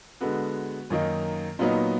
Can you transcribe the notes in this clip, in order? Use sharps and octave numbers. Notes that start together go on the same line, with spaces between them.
D3 G#3 B3 F#4
F#2 D#3 A#3 D#4
A#2 F#3 B3 D#4